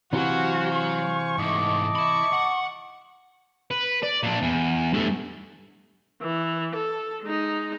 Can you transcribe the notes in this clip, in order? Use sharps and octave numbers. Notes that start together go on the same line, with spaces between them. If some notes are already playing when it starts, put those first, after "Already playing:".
C3 E3 F#3 F#4 C5 F5 G#5
C#6
G#2 A3 D#5 A5 D6
E5 B5 C#6
F#5
B4
D5
A#2 D4
E2
G2 A3
E3
A4
G#3 D#4